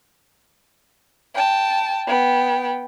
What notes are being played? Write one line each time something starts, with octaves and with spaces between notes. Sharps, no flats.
G5 A5
B3 G5